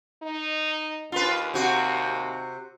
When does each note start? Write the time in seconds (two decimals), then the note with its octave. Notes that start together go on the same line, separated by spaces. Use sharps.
0.23 D#4
1.12 D#2 F4 B4
1.54 C3 F#4